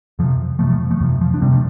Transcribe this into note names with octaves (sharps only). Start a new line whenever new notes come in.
F2 C3 F3
F2 C3 F3 A3
F3 A3
F3 A3
F2 C3 F3
F3
D4
F2 C3 G3 C4
F3 A3